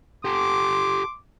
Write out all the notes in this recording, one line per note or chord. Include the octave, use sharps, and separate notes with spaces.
G4 A4 C6 D6